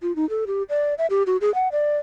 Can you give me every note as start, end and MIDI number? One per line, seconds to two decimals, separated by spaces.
0.02 0.15 65
0.16 0.28 63
0.30 0.45 69
0.47 0.63 67
0.69 0.94 74
0.98 1.06 76
1.10 1.23 67
1.27 1.37 66
1.41 1.53 68
1.55 1.68 78
1.72 1.98 74